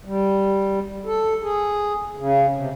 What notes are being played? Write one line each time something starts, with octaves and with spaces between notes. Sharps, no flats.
G3
A4
G#4
C#3
C3